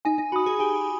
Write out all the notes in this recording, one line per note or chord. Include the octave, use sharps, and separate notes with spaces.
D#4 G#5
D#4
F#4 B5 D#6
G#4
G4 G#5